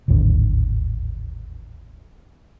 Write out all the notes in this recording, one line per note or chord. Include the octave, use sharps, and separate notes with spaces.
D1 G#1 D#2 D3